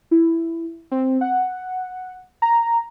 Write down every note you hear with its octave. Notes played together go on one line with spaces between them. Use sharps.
E4
C4
F#5
A#5